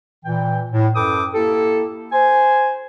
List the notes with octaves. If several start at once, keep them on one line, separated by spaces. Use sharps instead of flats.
A#2 E3 G5
A2
F#2 A4 B4 G5 D6 D#6
A#3 E4 G4 A4
C5 G#5